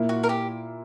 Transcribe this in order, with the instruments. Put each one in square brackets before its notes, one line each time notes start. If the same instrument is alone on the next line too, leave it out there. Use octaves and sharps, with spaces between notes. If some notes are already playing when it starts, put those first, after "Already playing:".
Already playing: [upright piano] A#2 A#3 E4
[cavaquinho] F#4
A#4
G4